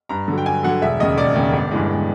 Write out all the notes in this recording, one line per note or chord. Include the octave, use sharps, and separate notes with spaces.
G2 A#5
D3
F#3 G5
G2 G#5
D3 F#3 F#5
E1 E5
D#2 C#3 D#5
E1 D5
D#2 C#3
G1
G2 E3 G#3
G1